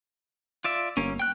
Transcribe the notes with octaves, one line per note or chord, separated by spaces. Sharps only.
F4 D5 E5
G1 A#3 C#4
G5 F#6